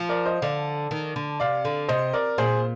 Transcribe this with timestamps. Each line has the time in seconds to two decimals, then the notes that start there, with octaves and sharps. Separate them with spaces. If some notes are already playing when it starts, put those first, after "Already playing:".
Already playing: F3
0.09 A#4 D5
0.26 C5 D#5
0.42 D3 D5 F5
0.91 D#3
1.16 D3
1.40 C3 D5 F5
1.65 D3
1.88 C3 C5 D#5
2.13 A#4 D5
2.38 A#2 G#4 C5